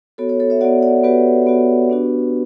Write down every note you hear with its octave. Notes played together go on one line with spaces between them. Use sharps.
B3 F#4 A4 C#5
A4 C#5
A4 C#5
C#5 E5
B3 F#4 D5 F#5
D5 F#5
B3 F#4 G4 B4
B3 F#4
B3 D4 F#4